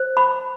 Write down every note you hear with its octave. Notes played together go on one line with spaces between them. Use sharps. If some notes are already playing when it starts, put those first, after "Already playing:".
Already playing: C5
B5